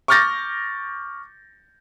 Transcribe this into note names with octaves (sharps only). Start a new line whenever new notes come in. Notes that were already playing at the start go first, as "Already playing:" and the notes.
C#6 D6 F6 G6 A6 A#6